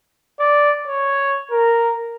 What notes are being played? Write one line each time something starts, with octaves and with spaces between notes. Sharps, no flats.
D5
C#5
A#4